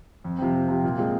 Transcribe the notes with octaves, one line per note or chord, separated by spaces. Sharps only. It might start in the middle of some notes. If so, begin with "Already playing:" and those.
F2
C3 F3 C4
F2
C3 F3 C4
A#2
F3 G#3 C4